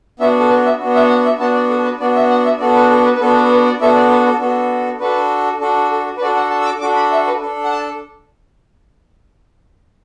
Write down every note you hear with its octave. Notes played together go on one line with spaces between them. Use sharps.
B3 D4 F#4 E5
A4
B4
E5
B3 D4 F#4
E5
F#5
E5
B3 D4 F#4 A5
D5
A4
B4
B3 D4 F#4 D5
E5
F#5
E5
B3 D4 F#4 A4 D5
B4
A4
B4
B4
B3 D4 F#4 A4
B4
A4
B4
D5
B3 D4 F#4 A4 E5
D5
B4
A4
B3 D4 F#4 A4
D4 F#4 A4 B4
D4 F#4 A4
A4
B4
D4 F#4 A4 D5
F#5
A5
E6
D6
D4 F#4 A4 D6
B5
E5
B4
D4 A4
F#5
A5